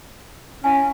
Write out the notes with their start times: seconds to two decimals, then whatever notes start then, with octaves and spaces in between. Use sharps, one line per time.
0.64 C#4 E4 F5 G#5